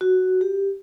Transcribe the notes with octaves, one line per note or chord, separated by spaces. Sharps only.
F#4
G4